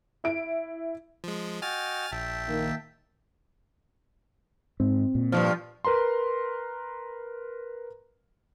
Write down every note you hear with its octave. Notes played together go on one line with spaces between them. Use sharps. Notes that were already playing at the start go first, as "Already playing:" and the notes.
E4 D7
F3 G#3
F#4 D#5 G5 G#5 F6 A6
A#1 E5 G5 A5
D#3 A#3
G#2 C4
A#2
G2 B2 F3
A#4 B4 A#5 C6